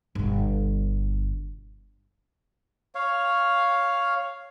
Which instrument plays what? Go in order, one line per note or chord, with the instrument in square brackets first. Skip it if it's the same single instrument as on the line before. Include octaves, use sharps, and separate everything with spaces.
[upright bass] G1 B2
[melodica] C#5 F5